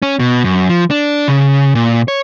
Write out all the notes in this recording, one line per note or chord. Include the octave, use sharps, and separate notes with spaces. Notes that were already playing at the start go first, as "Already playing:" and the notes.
C#4
B2
F#2
F3
D4
C#3
A#2
C#5